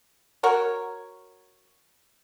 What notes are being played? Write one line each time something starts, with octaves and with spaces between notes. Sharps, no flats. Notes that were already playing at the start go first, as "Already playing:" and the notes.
F#4 A#4 C#5